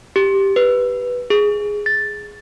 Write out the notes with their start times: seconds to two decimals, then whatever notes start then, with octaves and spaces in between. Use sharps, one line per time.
0.16 G4
0.56 B4
1.30 G#4
1.86 A6